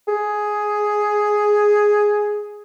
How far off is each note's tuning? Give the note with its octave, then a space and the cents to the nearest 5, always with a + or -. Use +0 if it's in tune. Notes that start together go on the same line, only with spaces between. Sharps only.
G#4 +5